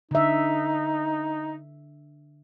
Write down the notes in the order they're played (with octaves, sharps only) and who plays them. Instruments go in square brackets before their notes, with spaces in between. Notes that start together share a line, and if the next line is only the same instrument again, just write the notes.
[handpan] D3 E5 [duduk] D#4